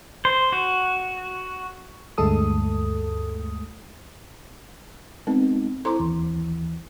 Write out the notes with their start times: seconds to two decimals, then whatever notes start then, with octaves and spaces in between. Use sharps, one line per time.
0.25 C5
0.52 F#4
2.18 D2 G2 G#3 A3 A4 D#6
5.27 G#3 B3 C4 D#4
5.85 E4 A4 C5 A#5 C6 D6
6.00 D#2 E3